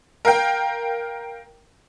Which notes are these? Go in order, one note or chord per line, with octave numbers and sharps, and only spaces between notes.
A#4 F5 G5